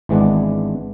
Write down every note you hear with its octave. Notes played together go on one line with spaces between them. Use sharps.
G#1 E3 G#3 B3 D4